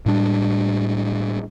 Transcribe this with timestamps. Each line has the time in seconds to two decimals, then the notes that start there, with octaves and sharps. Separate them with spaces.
0.06 A2 G3 D4